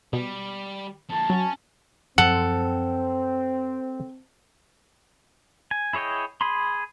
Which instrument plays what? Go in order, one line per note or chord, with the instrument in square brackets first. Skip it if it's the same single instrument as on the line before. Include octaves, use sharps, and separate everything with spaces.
[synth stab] B2 [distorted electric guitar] G3
[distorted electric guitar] F2 A#3 [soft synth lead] A5
[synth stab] F#3 [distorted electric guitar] C#4
[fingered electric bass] F#2 F3 F#3 [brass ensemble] C4 [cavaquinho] A4 [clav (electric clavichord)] F#5
[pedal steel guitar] G#5
E4 G#4 C#5 D#5 G5
G#4 B5 C6